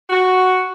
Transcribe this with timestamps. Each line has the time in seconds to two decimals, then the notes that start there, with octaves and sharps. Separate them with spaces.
0.10 F#4